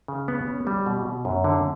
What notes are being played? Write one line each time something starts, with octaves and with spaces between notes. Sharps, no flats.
C#3
B3
C#4
G3
B2
B2
F#2
D3